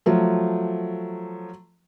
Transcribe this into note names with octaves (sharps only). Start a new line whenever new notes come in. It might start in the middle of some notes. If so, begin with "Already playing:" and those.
F3 F#3 A3